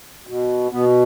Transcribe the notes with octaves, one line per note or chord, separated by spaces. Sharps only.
B2
B2 B3